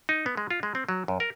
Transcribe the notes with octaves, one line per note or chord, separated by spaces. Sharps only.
D#4
B3
G#3
F4
G#3
C4
F#3
F#2
A#4